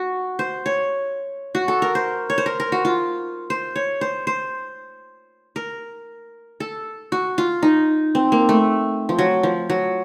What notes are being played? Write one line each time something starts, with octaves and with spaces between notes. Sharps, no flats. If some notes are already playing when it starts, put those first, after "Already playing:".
Already playing: F#4
C5
C#5
F#4
A4
A#4
C5
C#5
C5
A#4
A#4
F#4
F4
C5
C#5
C5
C5
A#4
A4
F#4
F4
D#4
C4
A#3
A3
F3
F#3
F3
F#3